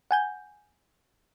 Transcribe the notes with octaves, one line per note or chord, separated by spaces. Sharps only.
F#5 G#5 G6